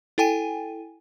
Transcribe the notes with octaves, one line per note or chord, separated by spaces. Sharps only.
E4 A4 G5 G#5 D#7